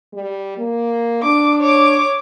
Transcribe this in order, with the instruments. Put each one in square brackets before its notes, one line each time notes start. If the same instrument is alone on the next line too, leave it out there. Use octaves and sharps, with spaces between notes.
[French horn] G3
A#3
[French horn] D4 [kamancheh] D6
[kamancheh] C#5 D6